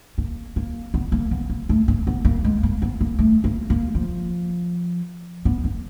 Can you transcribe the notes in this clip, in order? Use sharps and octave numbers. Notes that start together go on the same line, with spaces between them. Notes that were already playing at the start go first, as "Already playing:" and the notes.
A#3
A#3
B3
A#3
B3
A#3
A3
A#3
B3
A#3
G#3
A#3
B3
A#3
A3
A#3
A#3
F3
B3
A#3